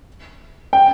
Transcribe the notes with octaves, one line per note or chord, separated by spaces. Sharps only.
G5